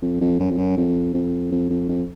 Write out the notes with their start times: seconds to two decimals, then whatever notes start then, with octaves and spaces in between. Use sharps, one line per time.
0.02 F2
0.21 F2
0.40 F#2
0.50 F2
0.58 F#2
0.77 F2
1.14 F2
1.52 F2
1.70 F2
1.89 F2